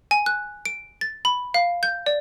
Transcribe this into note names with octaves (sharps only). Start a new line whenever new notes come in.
G#5
F#6
D7
A6
B5
F5
G6
D5